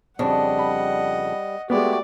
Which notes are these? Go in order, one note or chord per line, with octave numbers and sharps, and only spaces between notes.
F2 C#3 G3 D4 D#5 F#5
B5
G#3 A3 B3 F#4 G4 D5